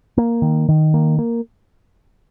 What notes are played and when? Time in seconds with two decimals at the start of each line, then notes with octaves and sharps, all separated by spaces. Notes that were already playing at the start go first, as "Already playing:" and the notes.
0.18 A#3
0.42 D#3
0.69 D#3
0.94 A#3
1.19 A#3